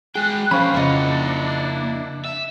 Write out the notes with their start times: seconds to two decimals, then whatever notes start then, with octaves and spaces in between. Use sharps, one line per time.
0.15 G#3 G#4 G5 F#6
0.51 F3 C#4 D4 C5 F5 B5 C#6 F#6
0.74 F2 C#3 A#3 D4 E4 D#5 F#5
2.25 E5